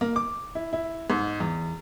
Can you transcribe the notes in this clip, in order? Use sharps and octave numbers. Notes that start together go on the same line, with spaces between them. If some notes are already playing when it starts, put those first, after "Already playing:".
A#3
D6
E4
E4
G#2
E2